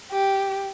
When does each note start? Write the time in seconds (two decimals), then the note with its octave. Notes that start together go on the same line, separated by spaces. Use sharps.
0.12 G4